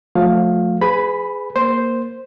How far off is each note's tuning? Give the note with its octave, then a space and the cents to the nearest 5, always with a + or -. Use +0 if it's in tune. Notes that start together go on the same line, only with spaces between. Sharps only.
F3 +35 A3 +0 F5 +10
G#4 +0 B4 +30 B5 +0
A#3 +0 C5 +0